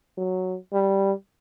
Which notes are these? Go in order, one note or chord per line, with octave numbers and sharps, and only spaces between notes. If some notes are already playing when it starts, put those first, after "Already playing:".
F#3
G3